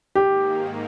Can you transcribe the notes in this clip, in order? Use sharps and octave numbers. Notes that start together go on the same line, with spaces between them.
G#2 D#3 A#3 G4